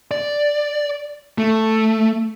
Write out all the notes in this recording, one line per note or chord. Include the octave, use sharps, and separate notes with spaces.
D5
A3